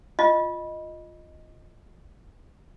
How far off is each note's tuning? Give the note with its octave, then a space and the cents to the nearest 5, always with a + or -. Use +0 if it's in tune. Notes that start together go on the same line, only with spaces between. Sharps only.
F4 +0 D#5 +0